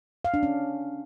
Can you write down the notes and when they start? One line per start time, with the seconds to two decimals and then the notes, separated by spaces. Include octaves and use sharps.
0.25 F5
0.34 D4
0.43 C#4